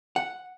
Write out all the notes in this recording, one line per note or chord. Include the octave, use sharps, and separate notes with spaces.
F#5